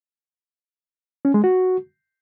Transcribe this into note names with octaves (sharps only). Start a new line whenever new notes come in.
C#4
G#3
F#4